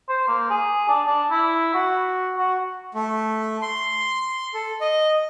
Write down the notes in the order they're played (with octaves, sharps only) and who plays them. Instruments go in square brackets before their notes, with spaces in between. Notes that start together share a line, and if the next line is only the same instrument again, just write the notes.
[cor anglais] C5
A#3
G#4
D4
D4
E4
F#4
F#4
[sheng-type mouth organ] A3
C6
A4
D#5